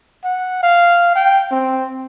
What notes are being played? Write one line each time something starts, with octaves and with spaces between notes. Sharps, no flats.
F#5
F5
G5
C4